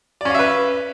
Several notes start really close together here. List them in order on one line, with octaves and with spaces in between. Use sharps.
D5 C#4 F5 E5 B4